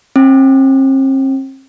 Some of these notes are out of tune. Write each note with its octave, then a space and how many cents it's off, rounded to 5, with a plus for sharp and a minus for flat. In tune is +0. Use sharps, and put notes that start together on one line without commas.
C4 +40